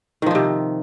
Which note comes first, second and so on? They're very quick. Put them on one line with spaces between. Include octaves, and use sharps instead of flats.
D#3 F3 D#4 C3